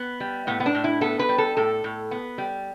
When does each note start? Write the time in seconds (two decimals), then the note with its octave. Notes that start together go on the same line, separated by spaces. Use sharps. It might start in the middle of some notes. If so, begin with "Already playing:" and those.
Already playing: B3
0.20 G3
0.47 A2 B3
0.60 B3
0.66 D4
0.75 A2
0.84 E4
1.01 B3 A4
1.19 B4
1.29 G3
1.38 A4
1.57 A2 A4
1.84 A2
2.11 B3
2.38 G3